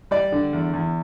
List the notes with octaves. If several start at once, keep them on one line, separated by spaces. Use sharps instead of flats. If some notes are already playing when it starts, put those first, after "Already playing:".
G3 D5
D3
E2
E2